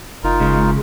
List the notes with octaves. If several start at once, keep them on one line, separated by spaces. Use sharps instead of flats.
F#1 D#4 F4 A#4
C#3 G#3